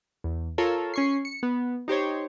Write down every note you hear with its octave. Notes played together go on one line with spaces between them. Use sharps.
E2
F4 A4 A#4 C#5
C#4 C#6 C7
C#7
B3
D#4 G4 C5 C#5